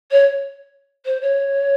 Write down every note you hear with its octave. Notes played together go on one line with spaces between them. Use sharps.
C#5
C5
C#5